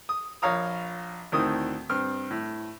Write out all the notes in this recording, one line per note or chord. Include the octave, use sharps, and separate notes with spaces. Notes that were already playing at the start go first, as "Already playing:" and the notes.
D#6
A#1 C#5 F5 A#5 D#6
D2 A2 D#3 C4 D#6
G2 C4 F6
A2